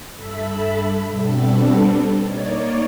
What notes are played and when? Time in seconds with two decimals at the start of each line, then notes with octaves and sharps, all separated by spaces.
0.14 G2 A4 E5 B5
1.08 B2 G3 B3 C4 D4 A4
2.21 A#3 D#4 C#5 D5